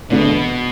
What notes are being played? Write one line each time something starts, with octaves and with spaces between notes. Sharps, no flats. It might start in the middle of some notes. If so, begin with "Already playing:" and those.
E1 D2 B2 D3 B3 D4